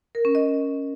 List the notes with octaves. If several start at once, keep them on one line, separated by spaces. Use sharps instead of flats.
A#4
C#4
D#5